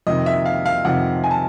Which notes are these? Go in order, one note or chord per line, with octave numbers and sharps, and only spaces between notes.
F2 C3 D#3 D#5
E5
F5
F5
F2 C3 D#3 F#5
G#5
A5